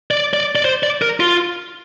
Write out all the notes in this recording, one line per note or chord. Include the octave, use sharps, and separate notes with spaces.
D5
D5
D5
C5
D5
A#4
F4